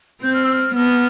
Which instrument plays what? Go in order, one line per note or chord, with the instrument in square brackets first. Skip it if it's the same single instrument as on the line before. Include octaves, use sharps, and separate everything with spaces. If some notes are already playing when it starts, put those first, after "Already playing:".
[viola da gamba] C4 [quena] G6
[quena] F6
E6
F6
[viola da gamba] B3 [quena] F6